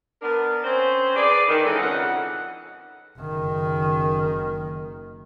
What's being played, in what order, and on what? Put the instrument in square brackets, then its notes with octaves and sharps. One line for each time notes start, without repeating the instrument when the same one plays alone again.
[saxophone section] B3 D4 A#4
C4 C#4 C5
G#4 B4 D5
D#3
E3 G#3 C#4 A4 B4
F2 C#3 D#4 F#5
[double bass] F#1 D#3